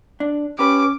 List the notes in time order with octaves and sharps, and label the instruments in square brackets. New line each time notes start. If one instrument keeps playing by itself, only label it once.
[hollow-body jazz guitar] D4
[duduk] C#4 [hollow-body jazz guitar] G4 B4 [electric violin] D6